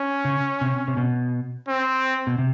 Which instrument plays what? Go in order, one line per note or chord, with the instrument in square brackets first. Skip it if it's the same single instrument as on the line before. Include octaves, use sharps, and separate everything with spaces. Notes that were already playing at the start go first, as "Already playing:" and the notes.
Already playing: [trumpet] C#4
[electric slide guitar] C#3
C3
C3
B2
[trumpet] C4
[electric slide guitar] B2
C3